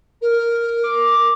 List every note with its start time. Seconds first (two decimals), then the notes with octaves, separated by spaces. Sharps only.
0.21 A#4
0.83 D6